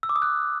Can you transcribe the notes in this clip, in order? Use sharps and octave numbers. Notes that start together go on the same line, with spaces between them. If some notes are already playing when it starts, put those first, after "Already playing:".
E6
D6
D#6
F#6